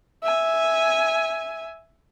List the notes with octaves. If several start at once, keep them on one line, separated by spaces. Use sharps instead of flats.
E5 G#5